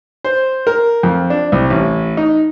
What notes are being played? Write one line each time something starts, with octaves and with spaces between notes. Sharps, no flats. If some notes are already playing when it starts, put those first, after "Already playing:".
C5
A#4
F2
D4
C2
A1
D#4